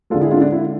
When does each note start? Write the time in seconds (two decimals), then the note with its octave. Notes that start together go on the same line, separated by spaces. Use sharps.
0.10 G#3 F4 A4
0.14 D3
0.21 E4 G#4
0.31 D4 F4
0.37 E4
0.41 D4
0.52 E4